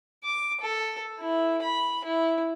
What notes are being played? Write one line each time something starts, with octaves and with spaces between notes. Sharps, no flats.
D6
A4
E4
B5
E4